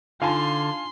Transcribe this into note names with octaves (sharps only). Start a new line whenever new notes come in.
D3 D4 D#4 F4 F5 G#5 A5 C6